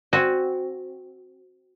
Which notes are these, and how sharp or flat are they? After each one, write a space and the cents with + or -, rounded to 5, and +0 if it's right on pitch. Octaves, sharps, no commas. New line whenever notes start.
C4 +0 F#4 +0 G#5 +0